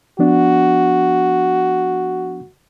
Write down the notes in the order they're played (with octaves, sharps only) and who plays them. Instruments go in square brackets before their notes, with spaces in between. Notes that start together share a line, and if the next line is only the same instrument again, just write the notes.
[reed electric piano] F3 B3 D4 [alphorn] F#4